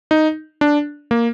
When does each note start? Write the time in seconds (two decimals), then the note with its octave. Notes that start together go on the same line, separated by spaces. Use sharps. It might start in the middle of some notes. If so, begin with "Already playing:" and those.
0.11 D#4
0.61 D4
1.11 A#3